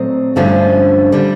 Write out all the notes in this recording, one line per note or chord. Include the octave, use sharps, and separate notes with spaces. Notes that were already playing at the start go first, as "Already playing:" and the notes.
Already playing: A#2 F#3 A3 C4 D#5
G2 D3 F3 A3 C#4
D3 G3